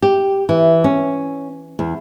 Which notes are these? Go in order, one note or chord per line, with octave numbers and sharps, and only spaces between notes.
G4
E3
C#4
E2